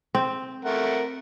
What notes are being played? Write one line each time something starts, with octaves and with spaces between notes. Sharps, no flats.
C4
A3 A#4 F#5